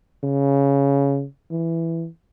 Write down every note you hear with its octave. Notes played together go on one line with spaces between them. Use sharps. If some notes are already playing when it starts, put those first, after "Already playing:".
C#3
E3